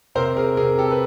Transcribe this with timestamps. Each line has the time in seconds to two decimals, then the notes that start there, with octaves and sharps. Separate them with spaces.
0.15 C3 A#4 C5
0.37 G#4 A#4
0.57 C3 G#4 A#4
0.78 G4 A4
0.91 B4